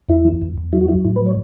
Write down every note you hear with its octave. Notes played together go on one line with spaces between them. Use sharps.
E2 E4
E3
E2
E2
F#3 E4
F#4
F#3 E4
A2 E4
B4
F#3
C#5